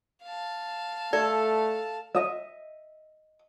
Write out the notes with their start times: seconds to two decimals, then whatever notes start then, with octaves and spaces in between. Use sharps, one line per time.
0.24 F5 A5
1.13 A3 A4 D5
2.15 D#5 E5